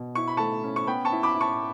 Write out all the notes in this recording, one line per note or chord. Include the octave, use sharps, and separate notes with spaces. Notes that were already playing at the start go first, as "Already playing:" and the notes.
Already playing: B2
E4 C#6
B5
A3 A5 C#6
C#4
C#6
B3 G5 B5
A5 C#6
E4
B5 D6
E4
A5 C#6